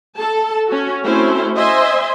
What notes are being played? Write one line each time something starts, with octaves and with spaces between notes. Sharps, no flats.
A4 A5
C#4 F#4
A3 C4 C#4 E4 F#4 C5
C5 D#5 E5 G#5 C6